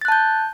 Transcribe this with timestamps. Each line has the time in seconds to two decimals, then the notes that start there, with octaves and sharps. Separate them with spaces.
0.01 A6
0.05 F#6
0.08 A5
0.12 G6